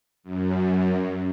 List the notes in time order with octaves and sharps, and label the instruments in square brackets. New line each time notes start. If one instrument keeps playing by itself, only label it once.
[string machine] F#2